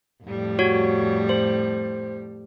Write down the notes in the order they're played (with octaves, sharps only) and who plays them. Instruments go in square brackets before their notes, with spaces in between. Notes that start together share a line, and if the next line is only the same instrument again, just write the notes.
[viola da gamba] F2 A2 G3
[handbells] F#4 C#5
C5